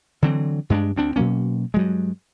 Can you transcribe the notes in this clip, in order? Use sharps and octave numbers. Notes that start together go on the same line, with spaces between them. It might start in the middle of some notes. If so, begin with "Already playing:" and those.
D3 E3 F#3 C4
G2 G#3 C#4 D4
D2 C4 D4
B2 F#3 A#3 C#4
G2 F#3 G#3